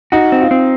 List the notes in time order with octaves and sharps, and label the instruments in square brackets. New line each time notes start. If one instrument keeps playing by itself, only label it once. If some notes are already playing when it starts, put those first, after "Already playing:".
[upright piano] D#4 [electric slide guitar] F#4
[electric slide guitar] C4
[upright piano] F4
[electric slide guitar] C4